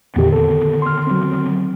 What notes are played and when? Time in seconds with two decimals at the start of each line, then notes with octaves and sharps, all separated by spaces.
0.16 E2 A#2 D3 D#3 B3 G4
0.33 A4
0.82 C6 F6
1.07 F#3 C4